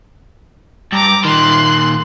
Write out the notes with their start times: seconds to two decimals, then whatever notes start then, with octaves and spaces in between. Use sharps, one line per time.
0.93 G2 A#5 D6
1.25 A#2 D#3 C6 F#6